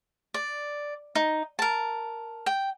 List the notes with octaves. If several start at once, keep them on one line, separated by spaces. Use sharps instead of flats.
D5
D#4
A#4 A5
G5